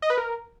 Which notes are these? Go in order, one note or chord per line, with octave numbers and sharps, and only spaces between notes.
D#5
B4
A#4